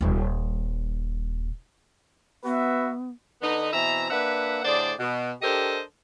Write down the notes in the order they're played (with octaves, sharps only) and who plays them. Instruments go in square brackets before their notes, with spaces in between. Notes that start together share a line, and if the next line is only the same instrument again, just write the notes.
[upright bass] D#1 G3
[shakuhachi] B3 [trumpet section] F#4 B4 E5
[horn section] D3 B3 D#4
B2 E3 C4 E5 A#5
A#3 D4 B4 E5 F#5
A2 D3 G#4 C5 D5
B2
D4 G4 A4 A#4 C5 D#5